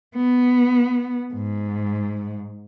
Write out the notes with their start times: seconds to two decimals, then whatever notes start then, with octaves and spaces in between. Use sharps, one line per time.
0.15 B3
1.34 G#2